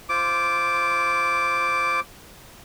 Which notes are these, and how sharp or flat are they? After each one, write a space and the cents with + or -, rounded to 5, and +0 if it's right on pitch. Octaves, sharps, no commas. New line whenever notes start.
F4 -20 C5 +0 D6 +0